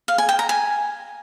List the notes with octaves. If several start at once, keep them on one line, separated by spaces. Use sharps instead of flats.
F5
G#5
G5
A#5
G#5